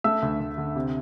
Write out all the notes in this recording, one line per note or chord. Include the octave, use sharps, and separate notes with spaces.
A3 E5 E6
D2
D2
D3
C3